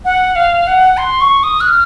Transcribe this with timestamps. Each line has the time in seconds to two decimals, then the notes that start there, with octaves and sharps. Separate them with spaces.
0.05 F#5
0.35 F5
0.67 F#5
0.97 C6
1.21 C#6
1.43 D#6
1.61 F#6
1.67 F6